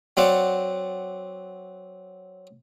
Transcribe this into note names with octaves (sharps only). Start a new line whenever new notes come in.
F#3 C4 D5 F5 F#5 A5